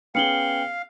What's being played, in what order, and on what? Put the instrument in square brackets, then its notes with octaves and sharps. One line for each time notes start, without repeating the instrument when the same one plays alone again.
[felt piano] B3 C#4 G#4 [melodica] F5 [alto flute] G5 [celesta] C#7 F#7 G7